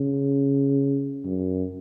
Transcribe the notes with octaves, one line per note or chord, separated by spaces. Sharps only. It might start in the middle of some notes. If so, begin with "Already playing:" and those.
Already playing: C#3
F#2